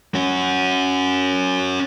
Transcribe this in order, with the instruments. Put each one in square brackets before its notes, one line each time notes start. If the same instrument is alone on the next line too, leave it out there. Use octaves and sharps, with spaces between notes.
[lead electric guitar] C#4 F#4